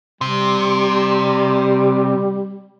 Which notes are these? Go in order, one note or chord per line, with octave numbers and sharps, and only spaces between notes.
C3 G3